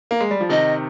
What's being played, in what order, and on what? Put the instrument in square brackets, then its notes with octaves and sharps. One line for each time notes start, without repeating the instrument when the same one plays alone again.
[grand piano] A#3
G#3
G3
F3
[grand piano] C3 D#3 [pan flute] D#5